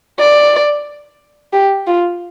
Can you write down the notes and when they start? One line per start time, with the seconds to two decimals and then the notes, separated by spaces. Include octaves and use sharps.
0.20 D5
1.53 G4
1.87 F4